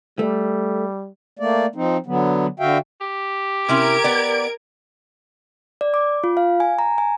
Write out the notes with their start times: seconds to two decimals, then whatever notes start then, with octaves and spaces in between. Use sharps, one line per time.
0.19 G3 A3
1.39 A3 A#3 D5
1.75 F3 C4 D#4
2.06 D3 F#3 B3
2.60 D3 F#4 E5 F5 G5
3.01 G4
3.68 C3 C#4 E4 A#4 G#6 D7
4.04 B3 D5
5.81 D5
5.94 D6
6.24 F4
6.37 F5
6.60 G#5
6.79 A#5
6.98 G#5